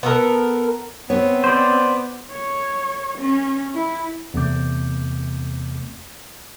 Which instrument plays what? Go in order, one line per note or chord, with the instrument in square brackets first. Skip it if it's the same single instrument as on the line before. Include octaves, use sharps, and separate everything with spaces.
[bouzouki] B3 A4 A#4
[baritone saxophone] B3 [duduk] C4 [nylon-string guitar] C#5
[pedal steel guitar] C5 D5
[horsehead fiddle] C#5
C#4
E4
[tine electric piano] E2 C3 A3 C4 D6 G6